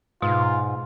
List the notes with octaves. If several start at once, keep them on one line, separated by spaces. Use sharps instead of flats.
G#2 B2 F4